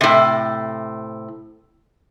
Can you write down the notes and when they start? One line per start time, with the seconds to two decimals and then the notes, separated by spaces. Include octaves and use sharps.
0.01 A2 C3